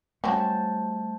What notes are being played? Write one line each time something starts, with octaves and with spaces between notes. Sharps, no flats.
F#3 G3 A3 C4 C#4 C5 A5 G6